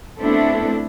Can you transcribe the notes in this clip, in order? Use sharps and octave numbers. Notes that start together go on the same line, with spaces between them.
A3 B3 C4 D4 E4 A4